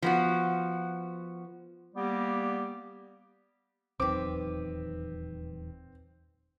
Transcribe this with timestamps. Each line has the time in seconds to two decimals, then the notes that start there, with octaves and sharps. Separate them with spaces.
0.02 F3 B3 F#4
1.96 G3 A#3 B3 G4
4.00 D#1 E2 D#3 F#3 C4 B4 D6